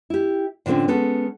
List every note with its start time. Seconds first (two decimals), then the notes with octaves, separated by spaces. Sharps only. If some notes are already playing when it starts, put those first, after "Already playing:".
0.10 E4 G4
0.66 A2 D3 F3 A#3 C4 C#4
0.88 G#3 B3 C#4 A4